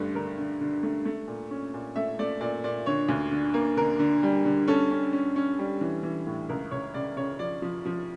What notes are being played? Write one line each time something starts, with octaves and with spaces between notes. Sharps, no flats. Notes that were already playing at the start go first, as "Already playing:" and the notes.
Already playing: G2 D3 A3
D3 A#4
D3
D3
A3
A3
A#2
C#4
A#2
A3 E5
A3 D5
A#2 D5
A#2 D5
D3 C#5
D2
D3
A#3
D3 A#4
D3
G3
D3
C#4 A4
C#4
C#4
C#4
G3
E3
E3
A2
C#2 A#4
C#2 C#5
C#3 D5
C#3 C#5
F3 D5
F3
F3